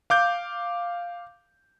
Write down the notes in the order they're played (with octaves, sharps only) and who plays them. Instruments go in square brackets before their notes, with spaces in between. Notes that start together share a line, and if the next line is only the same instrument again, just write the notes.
[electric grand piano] F5 D6 G6